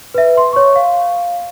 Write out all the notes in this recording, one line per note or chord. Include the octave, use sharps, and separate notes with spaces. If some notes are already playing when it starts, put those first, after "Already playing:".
B4 E5
C6
C#5 C#6
F5